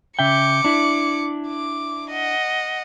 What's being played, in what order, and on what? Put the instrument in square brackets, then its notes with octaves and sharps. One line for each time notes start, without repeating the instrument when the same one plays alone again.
[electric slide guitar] C#3 E5 G5 [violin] D6 C#7
[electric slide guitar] D4 E4
[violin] D6
D#5 F#5